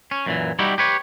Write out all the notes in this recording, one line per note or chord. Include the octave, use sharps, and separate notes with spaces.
C#4
F#2 A#2 E3
G3 D#4 E4 F#4 G4
G4 B4 C#5